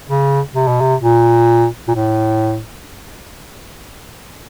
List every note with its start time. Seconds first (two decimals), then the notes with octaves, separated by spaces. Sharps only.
0.08 C#3
0.54 C3
0.68 B2
0.80 C3
1.02 A#2
1.88 A#2
1.95 A2